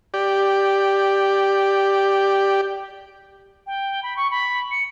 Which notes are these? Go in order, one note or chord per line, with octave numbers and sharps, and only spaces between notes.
G4 D5
G5
B5
C#6
B5
C#7